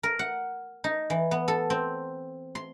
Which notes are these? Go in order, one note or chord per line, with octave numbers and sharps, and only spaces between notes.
A#4
F#5
D#4
E3
B3
A4
C4
C6